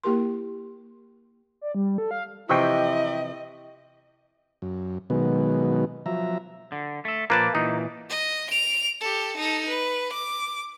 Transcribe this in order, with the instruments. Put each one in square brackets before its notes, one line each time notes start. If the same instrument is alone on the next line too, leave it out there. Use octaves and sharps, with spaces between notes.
[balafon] A#3 E4 G4 A#4 C6
[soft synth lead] D5
G3
A4
F5
[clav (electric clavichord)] C3 E3 F3 [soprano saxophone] E4 [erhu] D#5 [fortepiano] G5 C#6 E6
[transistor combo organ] F#2
B2 D#3 F#3 G#3 B3
F3 F#3 E5 A#5
[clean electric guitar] D3
A3 A4
[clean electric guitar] A#2 F3 D5 [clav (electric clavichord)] A#3 B4 A5
[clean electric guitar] A#2 E3 [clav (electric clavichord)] D#4
[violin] D#5
D7 F7
G4 A4
D#4 A4
B4
D6